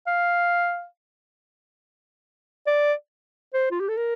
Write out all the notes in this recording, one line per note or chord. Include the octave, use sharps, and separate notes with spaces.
F5
D5
C5
F4
G4
A4
A#4